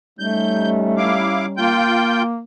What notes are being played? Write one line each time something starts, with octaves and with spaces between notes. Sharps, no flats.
G3 A3 C#4 D#4 G6
E4 F5 D6
A#3 F4 G5 G6